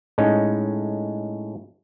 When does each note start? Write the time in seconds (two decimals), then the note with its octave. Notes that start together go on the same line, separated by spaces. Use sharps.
0.18 A2 G#3 C#4 D#4